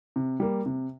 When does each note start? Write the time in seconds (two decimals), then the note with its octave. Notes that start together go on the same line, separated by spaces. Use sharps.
0.16 C3
0.40 G3 A#3
0.66 C3